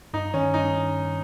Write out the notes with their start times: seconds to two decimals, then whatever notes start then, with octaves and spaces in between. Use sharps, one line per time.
0.13 G2 D#4
0.34 D#3 C#4
0.54 G2 D#4